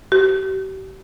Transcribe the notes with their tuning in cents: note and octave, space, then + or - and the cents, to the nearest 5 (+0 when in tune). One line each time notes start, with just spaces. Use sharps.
G4 -40